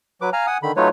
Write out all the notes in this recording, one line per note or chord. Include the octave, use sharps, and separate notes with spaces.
F#3 B4 D6
F5 G#5 A#5 F6
F#5 G#5 D#6
D3 D#3 B5
F#3 A3 D#4 F4 B4 C#5